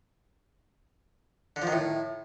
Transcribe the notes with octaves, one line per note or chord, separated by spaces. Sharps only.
D3
F3
D#3
A2